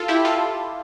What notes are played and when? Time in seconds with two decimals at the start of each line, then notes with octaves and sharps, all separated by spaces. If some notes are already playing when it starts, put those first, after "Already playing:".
Already playing: F4 A4
0.08 E4 G4
0.25 F4 A4